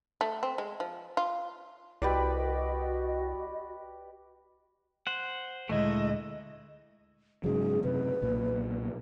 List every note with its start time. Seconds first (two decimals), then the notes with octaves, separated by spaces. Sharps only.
0.21 A3
0.43 C4
0.58 G#3
0.80 F3
1.17 F4
2.02 C2 F#4 G4 B4 D5 D#5
5.07 C5 F#5
5.69 D2 A#2 G#3 A3 E4 D#5
7.44 G#2 C#3 F#3 G#4
7.84 F#2 C3 B4
8.22 B1 A#2